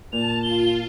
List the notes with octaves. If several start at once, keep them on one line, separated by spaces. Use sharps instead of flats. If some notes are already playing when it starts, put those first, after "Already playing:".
A#2 A5 F7
F4 G7